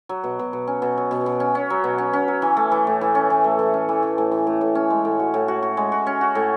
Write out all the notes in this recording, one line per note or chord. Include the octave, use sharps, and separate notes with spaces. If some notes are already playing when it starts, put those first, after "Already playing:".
F#3
B2
B2
B2
C#4
B2
F#3
B2
B2
C#4
C#4
F#3
B2
C#4
C#4
F#3
E3
A3
E3
A2
E3
C#4
E3
A3
E3
C#4
E3
E3
A2
E3
A2
A2
C#4
G#3
A2
F#4
A2
F#4
F#4
G#3
F#4
C#4
F#4
A2